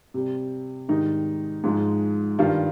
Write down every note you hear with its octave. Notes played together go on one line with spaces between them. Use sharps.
C3 G3
G#2 D#3 G3 D#4
G#2 F3 G#3
G2 D#3 G3 F4